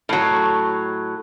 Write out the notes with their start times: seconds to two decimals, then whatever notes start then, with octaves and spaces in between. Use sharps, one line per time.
0.09 A2 F#3